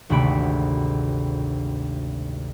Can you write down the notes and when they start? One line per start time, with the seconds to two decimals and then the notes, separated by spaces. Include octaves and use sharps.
0.10 G#1 D2 C3 F#4 B5 D7